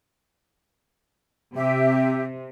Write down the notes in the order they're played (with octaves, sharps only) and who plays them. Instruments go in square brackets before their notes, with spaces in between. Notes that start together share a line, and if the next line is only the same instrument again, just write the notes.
[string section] C3 [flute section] G4 E5